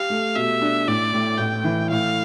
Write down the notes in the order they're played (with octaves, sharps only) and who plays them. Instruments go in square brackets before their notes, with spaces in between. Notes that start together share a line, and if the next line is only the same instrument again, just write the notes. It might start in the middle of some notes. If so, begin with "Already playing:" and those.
Already playing: [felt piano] G4 [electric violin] F5
[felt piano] A3
[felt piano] B2 [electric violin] E5
[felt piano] D4
[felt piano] A1 [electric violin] D5
[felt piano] A2
[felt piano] A1 [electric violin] G5
[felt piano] E3
[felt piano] A2 [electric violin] F5